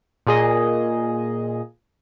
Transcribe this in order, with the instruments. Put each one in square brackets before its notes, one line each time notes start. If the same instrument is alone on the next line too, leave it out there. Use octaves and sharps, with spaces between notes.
[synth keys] A#2 G#4 D#5